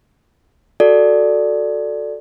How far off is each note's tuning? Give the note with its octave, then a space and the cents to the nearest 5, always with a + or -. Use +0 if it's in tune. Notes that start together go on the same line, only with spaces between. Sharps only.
F#4 +0 A4 +0 D5 +0